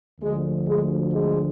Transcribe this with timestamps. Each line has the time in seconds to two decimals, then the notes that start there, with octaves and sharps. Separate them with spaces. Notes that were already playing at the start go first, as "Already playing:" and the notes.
0.21 D2 D3 F3 G#3
0.66 G#3
1.11 G#3